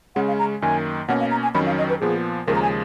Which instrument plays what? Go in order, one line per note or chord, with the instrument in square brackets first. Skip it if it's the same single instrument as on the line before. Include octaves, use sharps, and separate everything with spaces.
[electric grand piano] C#3 G#3 C#4 [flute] F#5
[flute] F5
A#5
[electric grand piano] F#2 D#3 A#3 [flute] G#5
[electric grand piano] B2 A#3 C#4 [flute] F#5
[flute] F5
A#5
G#5
[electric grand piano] F2 D#3 F#3 C#4 [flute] B5
[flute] F5
D#5
B4
[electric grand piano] A#2 F3 B3 [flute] G#4
[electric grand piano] D#2 C#3 F3 G#3 [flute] A#4
[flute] A#5
G#5